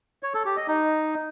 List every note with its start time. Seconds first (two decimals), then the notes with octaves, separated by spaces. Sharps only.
0.23 C#5
0.34 A4
0.45 G4
0.57 D#5
0.68 D#4